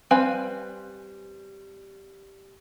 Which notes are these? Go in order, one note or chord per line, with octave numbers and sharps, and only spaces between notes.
G3 C4 B4 F5 G#5